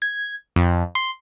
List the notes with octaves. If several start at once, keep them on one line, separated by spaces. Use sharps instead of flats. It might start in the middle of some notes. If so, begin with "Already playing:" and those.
G#6
F2
C6